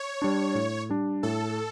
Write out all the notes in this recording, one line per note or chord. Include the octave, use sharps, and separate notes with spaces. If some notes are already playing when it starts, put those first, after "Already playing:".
Already playing: C#5
G3 D4
A2
G3 D4
A2 A4